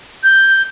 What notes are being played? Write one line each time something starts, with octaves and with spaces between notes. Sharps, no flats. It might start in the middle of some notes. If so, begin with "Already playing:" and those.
G6